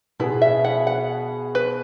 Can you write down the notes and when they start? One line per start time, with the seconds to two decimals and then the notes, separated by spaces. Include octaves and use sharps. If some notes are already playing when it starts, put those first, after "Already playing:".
0.20 B2 B3 E4 G#4
0.42 E5
0.65 F#5
0.87 F#5
1.55 B4